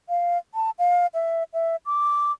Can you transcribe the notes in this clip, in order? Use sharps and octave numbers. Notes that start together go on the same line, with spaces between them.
F5
A5
F5
E5
E5
D6